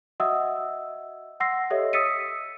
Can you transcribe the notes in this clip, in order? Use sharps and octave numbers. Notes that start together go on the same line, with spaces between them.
F#4 D#5 E5 F#5 D#6 E6
F#5 C6 E6 A#6 C7
G4 A4 C#5 D#5 E5
D#6 E6 A6 B6 C#7 D#7